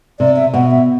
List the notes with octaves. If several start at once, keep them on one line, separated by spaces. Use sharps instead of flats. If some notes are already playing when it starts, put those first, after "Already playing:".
C3 D5
E5
B2 F#5
E5